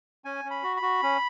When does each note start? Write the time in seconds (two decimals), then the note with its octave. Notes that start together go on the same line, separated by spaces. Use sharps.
0.25 C#4 G#5
0.45 C#4
0.51 B5
0.63 F#4
0.77 B5
0.82 F#4
1.03 C#4